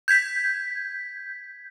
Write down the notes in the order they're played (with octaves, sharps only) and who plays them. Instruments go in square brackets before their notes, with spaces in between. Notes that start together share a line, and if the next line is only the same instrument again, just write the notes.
[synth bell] G6 G#6 B6